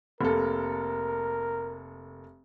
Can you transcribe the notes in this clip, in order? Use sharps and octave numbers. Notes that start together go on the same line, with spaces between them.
F1 A#3 A4 A#4